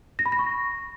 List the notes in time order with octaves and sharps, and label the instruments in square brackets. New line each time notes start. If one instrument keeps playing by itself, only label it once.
[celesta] A#6
B5
A#6
C#6